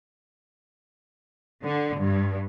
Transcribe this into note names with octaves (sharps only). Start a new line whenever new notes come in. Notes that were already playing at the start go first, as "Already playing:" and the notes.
D3
G2